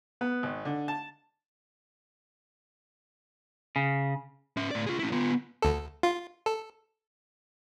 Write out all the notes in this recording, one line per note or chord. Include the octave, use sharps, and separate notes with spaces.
B3
G#1
D3
A5
C#3
C#4 E5
A2 D5
F4 G#4
C#4 E4
B3 F4
D2 A4
F4
A4